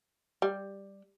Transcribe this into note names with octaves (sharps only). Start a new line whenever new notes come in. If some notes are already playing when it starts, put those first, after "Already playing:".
G3